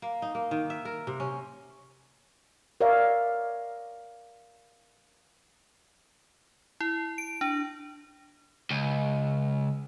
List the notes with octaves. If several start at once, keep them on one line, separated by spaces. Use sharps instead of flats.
A#3
D#4
A#3
D#3
E5
A#4
C3
C#4
A#4 C#5 D5 E5 F5
E4
D7
D4
C#2